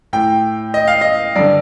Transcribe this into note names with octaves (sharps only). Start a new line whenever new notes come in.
A2 G5
D#5
F5
D#5
G2 D3 D5